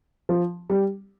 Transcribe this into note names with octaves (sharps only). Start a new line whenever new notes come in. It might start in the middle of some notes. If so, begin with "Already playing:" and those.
F3
G3